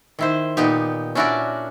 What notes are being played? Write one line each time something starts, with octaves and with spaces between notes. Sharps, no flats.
D#3 E4 C5
A#2 B3 D#4 G4
C#4 D4 E4 F#4 A#4 D5